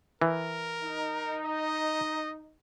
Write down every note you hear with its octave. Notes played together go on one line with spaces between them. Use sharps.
E3 A#4
D#4
D#5